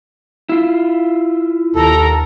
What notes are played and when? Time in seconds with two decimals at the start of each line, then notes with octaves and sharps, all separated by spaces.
0.49 E4 F4
1.75 D#2 A4 A#4 A#5